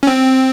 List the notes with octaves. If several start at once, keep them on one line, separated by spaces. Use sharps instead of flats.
C#4
C4